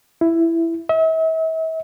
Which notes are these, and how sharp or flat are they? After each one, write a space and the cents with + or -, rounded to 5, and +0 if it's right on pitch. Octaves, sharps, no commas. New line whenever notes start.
E4 +10
E5 -40